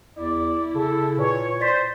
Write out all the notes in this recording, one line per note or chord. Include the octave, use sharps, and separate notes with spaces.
E2 E4 D5
C#3 G#4 A4
A#2 B4 C#5
C5 D5 A6 B6